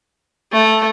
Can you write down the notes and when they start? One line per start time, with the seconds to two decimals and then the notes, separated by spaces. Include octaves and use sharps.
0.52 A3